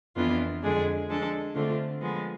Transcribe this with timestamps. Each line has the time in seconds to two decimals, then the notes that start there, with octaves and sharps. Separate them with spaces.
0.16 F2 E3 B3 D4 F4
0.63 F2 D3 G#3 D4 G#4
1.09 F3 G#3 D4 A4
1.54 D3 A3 C4 F4
2.01 F3 G#3 B3